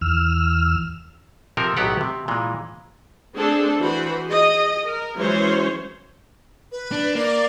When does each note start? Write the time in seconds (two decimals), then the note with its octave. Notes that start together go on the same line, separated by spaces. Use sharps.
0.01 E2 E6 F6
1.57 C3 F3 C4 A4 A#4
1.77 B1 A2 F#3 B3 G4 F#5
2.01 C3
2.28 A#2 E3 G#3
3.36 A3 C4 D4 G#4 A4
3.79 E3 F#4 C5 B5
4.24 G#4 D#5
4.84 A#4
5.17 E3 F#3 G#3 C#4 C5 C#5
6.72 B4
6.92 D4
7.15 A#3 D5